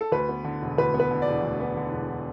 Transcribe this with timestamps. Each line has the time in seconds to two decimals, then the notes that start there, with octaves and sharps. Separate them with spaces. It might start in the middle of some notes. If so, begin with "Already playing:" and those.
0.01 A4
0.12 D2 B4
0.29 B3
0.45 D3
0.62 E1
0.78 D2 B4
0.94 B3
1.00 B4
1.11 D3
1.22 D5
1.27 E1
1.43 D2
1.60 B3
1.77 D3
1.93 E1